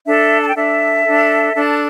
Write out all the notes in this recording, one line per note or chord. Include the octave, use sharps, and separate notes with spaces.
D4 A4 E5
A5
G5
D4 A4 E5
D4 A4
D4 A4